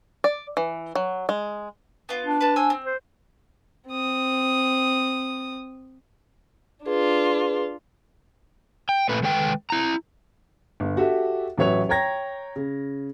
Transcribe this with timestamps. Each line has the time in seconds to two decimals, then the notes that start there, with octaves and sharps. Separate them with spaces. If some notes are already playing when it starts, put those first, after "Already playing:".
0.24 D5
0.57 E3
0.95 F#3
1.29 G#3
2.09 B3 F4
2.26 D4
2.41 B4 A5
2.56 C5 G#5 E6
2.70 C4
2.86 C5
3.88 C4 D#6
6.86 D4 F4 G#4 B4
8.89 G5
9.09 A#2 A3 B4
9.23 D#3 G#3 A4 B4 G5
9.70 E4 A#5
10.80 G1
10.97 F#4 G4 A4 E5
11.58 A1 F#3 B4 C#5 E5 F7
11.89 C#5 G5 A#5 G#6 A#6
12.56 C#3